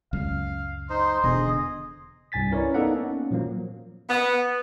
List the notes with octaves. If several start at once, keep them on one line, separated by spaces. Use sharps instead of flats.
C#2 F#2 F5
D#4 C5 C6
E1 B2 D3 G#4 D#5
C2 G2 G#5 A6 B6
C#4 E4 A#4 B4 C#5 D5
B3 D#4 A4 D5 F5 F#5
A#3 C#4
A#2 F3 F#3 A#3
B3